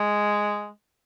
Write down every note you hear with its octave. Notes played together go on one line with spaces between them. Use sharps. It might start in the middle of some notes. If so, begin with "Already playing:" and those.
Already playing: G#3